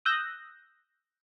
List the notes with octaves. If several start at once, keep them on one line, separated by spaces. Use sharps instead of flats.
D#6 E6 F#6 G6 A#6